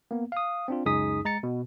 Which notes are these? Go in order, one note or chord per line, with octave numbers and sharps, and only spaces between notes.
A#3 B3
F5 D#6
C4 D4 F4
C#2 F#2 D#4 G#4 D#6 B6
G#3 A#5 A6 C#7
B2